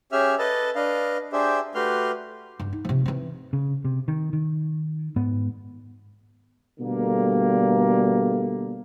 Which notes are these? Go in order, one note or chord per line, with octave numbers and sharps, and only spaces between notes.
C#4 G4 G#4 E5 F6
A4 B4 D#5 A5
D4 B4 D#5 F5
D4 G4 G#4 C5 E5
A3 F#4 G4 B4 C6 F6
G2
D#4
C3 F3
E3 C4
C#3
C3
D#3
D#3
G#2 B3
B2 D3 G3 A3 A#3